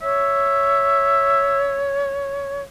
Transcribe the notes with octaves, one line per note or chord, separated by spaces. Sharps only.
C#5 E5